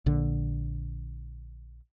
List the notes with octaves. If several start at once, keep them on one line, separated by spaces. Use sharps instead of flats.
A#1 D3